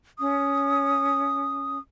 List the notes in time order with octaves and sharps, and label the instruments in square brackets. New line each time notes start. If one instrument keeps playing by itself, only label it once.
[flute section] C#4 D#6